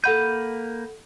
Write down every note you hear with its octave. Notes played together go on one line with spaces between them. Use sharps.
A#3 A4 F#5 B5 G6 D#7